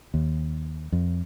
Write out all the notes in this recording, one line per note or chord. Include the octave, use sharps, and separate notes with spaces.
D#2
F2